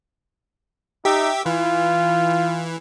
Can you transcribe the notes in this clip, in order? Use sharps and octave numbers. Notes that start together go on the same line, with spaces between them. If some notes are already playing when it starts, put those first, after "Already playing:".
D#4 G4 E5
E3 F4